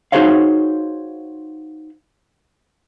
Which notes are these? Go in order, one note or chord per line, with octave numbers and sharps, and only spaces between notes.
D#4 F#4 G#4 C5 C#5 F5